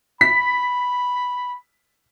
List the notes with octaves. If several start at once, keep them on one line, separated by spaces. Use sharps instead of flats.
B5 B6